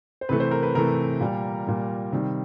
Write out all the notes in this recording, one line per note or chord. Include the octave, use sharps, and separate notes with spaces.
C5
C3 E3 A3 B4
C5
A#4
B4
C3 E3 A3 A#4
A#2 G3
A#2 G3
C3 D#3 G3